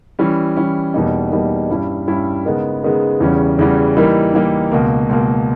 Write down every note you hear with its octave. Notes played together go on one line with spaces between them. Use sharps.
E3 G3 C#4
E3 G3 C#4
E2 B2 G3 A#3 D#4
E2 B2 G3 A#3 D#4
G2 G3 C#4 E4
G2 G3 C#4 E4
C#3 G#3 B3 D#4 A#4
C#3 G#3 B3 D#4 A#4
E2 C#3 E3 G3 C#4
E2 C#3 E3 G3 C#4
E3 G3 A#3 D#4 A#4
E3 G3 A#3 D#4 A#4
C#2 B2 A#3
C#2 B2 A#3